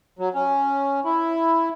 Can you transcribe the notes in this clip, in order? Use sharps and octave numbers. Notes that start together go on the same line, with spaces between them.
F#3
C#4
E4